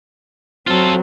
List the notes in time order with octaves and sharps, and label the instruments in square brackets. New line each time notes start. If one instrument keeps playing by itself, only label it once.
[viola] F#3 C4 [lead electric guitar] F4 A4